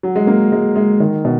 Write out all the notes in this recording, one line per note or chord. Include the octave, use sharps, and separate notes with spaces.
F#3
G#3
A#3
G#3
G#3
D#3
B2